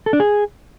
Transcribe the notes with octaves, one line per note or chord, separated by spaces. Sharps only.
A4
D4
G#4